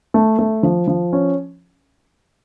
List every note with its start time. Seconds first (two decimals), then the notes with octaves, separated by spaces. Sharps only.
0.14 A3
0.39 A3
0.63 F3
0.87 F3
1.13 C#4